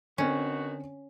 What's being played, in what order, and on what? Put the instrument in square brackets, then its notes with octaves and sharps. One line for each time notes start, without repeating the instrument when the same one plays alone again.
[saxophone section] B2 D#3 F#4 [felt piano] D3 C4 [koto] C#4